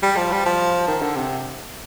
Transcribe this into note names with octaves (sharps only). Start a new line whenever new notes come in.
G3
F3
G3
F3
D#3
D3
C3